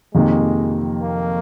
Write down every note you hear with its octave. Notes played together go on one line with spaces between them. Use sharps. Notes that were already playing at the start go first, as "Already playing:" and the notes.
F2 C3 D#3 G#3 A#3
A#3